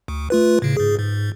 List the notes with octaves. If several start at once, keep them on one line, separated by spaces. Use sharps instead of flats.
D2
A3 F4 B4
A2 C#3
G#2 G#4
G#2